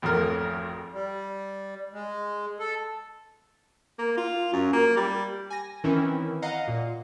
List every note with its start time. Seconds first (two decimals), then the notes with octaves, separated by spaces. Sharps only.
0.02 G#1 F2 A2 A#4
0.94 G3
1.93 G#3
2.60 A4
3.99 A#3
4.17 F4
4.53 F#2
4.73 A#3
4.97 G3
5.50 G#5 A#6
5.84 D#3 E3 C4 C#4 E4
6.42 D#5 F5 F#5 A#5
6.68 A#2